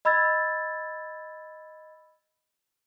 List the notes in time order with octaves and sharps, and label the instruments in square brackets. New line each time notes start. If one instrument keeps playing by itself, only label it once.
[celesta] D#5 B5 E6 G#6 A6